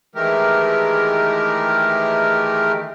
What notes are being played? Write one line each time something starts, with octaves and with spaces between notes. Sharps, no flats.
D#3 E3 G#3 A3 G4 A#4